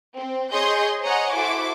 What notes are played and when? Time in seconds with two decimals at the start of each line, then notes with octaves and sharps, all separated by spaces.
0.15 C4
0.52 G#4 C#5 D#5 C6 G6
1.03 C5 C#5 D#5 F#5 G#5 A#5
1.35 E4 F#4 A4 C5 D6